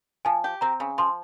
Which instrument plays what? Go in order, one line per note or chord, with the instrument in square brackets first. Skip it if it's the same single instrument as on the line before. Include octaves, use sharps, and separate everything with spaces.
[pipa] F3 [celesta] G#5
[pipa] G4
[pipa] C4 [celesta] A#5
[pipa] C#3
[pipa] F3 [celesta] C6